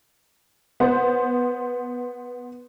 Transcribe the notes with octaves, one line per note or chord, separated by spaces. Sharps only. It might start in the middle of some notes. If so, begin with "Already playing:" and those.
B3 C5